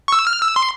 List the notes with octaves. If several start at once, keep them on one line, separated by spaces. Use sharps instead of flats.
C#6
E6
F6
E6
C6